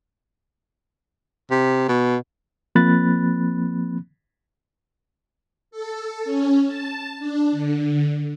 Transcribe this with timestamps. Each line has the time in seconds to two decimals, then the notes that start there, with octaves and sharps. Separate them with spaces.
1.51 C3
1.88 B2
2.75 F3 A#3 C4 B5 F#6 A6
5.71 A4
6.25 C#4
6.66 A5
7.19 D4
7.52 D3